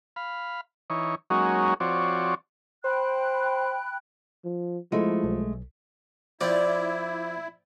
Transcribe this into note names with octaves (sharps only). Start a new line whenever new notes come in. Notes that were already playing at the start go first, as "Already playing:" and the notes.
F5 B5
E3 D#4 C#5
F#3 G#3 A#3 C#4 D#4 F#4
F3 C4 F#4 C#5 D5
C5 G5 B5 F#6
F3
F3 G#3 A3 E4
B1
F3 C4 E4 D5